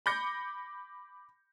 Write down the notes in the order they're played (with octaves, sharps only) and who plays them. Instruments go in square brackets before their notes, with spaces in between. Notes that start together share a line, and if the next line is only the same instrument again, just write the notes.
[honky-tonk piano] B5 D6 G6 A#6 C#7